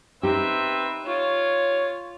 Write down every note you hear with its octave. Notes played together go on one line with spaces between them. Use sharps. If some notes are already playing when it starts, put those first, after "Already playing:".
C4 D#4 G4 B4 E5
F4 C#5